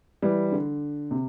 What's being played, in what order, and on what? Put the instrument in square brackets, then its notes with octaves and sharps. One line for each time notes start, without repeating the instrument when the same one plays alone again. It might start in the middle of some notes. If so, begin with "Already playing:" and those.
[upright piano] E3 G3
D3
C3